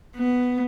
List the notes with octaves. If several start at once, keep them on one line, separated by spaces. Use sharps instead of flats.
B3